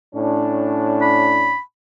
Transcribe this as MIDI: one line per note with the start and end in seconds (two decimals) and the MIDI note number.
0.15 1.55 45
0.15 1.55 61
0.15 1.55 62
1.02 1.60 83